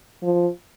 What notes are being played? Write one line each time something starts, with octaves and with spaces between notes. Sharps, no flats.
F3